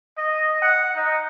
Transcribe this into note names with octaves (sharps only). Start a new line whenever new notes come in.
D#5
F#5
D#4